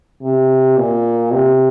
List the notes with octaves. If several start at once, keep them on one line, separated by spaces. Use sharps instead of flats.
C3
A#2
C3